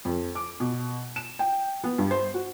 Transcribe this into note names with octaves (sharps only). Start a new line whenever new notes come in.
F2
D6
B2
E7
G5
B3
G2
C5
F#4